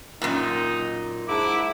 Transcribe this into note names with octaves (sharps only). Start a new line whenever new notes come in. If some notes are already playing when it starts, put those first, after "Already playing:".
F#2 A#2 D#4
G#2 D4 E4 D6